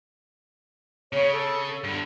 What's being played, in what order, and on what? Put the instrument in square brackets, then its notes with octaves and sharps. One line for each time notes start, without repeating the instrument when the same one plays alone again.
[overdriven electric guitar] C#3 [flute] C#5
[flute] A4
[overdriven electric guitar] G2 D3